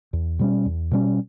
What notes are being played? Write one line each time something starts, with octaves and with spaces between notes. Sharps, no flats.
E2
B2 G3 C#4
E2
B2 G3 C#4